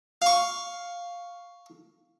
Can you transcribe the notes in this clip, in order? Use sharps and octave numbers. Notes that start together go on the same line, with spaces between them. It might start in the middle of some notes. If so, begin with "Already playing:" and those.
F5 C#6